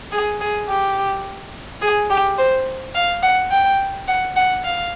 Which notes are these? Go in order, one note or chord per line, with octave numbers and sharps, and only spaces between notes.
G#4
G#4
G4
G#4
G4
C5
F5
F#5
G5
F#5
F#5
F5